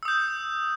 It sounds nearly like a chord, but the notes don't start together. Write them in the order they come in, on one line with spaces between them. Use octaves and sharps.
E6 D#6 G6